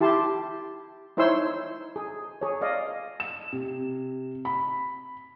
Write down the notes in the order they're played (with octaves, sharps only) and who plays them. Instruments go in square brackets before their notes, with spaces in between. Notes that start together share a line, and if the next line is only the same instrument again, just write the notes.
[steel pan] E4 G4 A5 C6
D#4 E4 C5 C#5 C6 E6
G#4
G#4 C#5
D5 D#5 F5
[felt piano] E7
C3
B5